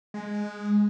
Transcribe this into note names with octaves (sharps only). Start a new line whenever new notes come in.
G#3